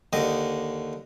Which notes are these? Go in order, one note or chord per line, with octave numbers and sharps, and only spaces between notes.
D#2 D3 D#5